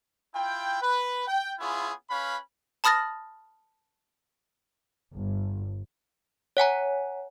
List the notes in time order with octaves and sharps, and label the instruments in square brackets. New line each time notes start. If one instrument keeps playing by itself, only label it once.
[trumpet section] E4 F4 G5
B4
G5
B3 C#4 E4 F4 G#4
C#4 B4 F5 B5
[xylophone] A5 B5 D#6 F6 A6 A#6
[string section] G1
[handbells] C#5 F#5 G#5 A#5